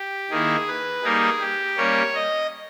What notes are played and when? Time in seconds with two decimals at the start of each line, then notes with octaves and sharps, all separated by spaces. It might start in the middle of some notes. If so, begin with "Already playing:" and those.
Already playing: G4
0.31 D#3 A#3 E4 G#4
0.67 B4
1.04 G3 A#3 D#4 G#4
1.41 G4
1.77 G3 A#3 C#4 C#5
2.15 D#5